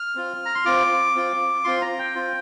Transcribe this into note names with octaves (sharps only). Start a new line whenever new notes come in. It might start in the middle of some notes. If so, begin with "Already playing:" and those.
Already playing: F6
C4 F4
A#5
C6
C4 F4 D6
C4 F4
C4 F4 C6
A#5
G5
C4 F4